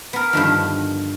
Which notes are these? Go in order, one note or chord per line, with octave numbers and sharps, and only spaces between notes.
B3 A#4
G2 D3 D#3 F3